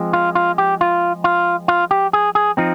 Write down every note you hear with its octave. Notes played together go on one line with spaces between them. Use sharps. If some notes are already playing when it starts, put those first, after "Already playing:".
Already playing: F3 G#3 C4
F4
F4
G4
F4
F4
F4
G4
G#4
G#4
F3 C4 D#4